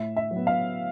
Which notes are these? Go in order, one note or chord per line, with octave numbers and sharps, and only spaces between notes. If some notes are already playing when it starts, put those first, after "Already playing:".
Already playing: A2 E5
E5
F#3
B3
F5